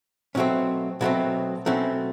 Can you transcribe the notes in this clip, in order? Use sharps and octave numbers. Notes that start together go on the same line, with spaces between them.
B2 F#3 A3 C4 C#4
B2 F#3 A3 C4
B2 F#3 A3 C4 C#4